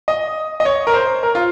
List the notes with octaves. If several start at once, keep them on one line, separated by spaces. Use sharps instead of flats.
D#5
D#5
C#5
A#4
C5
A#4
F4